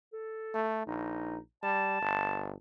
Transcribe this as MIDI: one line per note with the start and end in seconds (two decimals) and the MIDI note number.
0.13 0.70 69
0.54 0.85 57
0.87 1.37 34
0.87 1.38 63
1.63 2.00 55
1.63 2.49 81
2.02 2.54 31